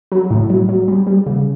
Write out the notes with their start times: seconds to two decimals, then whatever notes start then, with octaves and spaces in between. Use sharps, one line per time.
0.12 F#3
0.31 A2
0.50 F#3
0.69 F#3
0.88 G3
1.07 G3
1.26 C#3